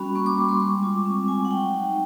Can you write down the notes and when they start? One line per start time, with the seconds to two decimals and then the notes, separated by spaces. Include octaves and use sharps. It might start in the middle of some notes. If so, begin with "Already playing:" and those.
Already playing: G3 C#4 F#4 B5
0.15 A#3 C#6
0.26 D6
0.38 G3 C#6
0.49 C6
0.60 G#3 C#6
0.83 F4 D6
1.05 C4 C#6
1.28 G#3 G#5
1.45 F#5
1.51 F#3 G5
1.73 D#4